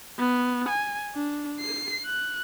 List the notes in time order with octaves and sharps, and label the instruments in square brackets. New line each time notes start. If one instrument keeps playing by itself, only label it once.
[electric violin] B3
G#5
D4
C7
F#6